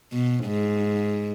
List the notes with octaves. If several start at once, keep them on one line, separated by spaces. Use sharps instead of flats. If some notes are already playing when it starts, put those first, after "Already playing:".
B2
G#2